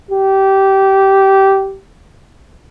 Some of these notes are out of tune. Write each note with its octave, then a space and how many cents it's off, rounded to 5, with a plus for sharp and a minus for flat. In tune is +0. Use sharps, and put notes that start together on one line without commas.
G4 -15